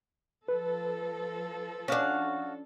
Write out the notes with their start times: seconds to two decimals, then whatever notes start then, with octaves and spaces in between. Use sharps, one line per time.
0.48 F3 A4 B4
1.88 C#4 D4 F#4 F5 F#5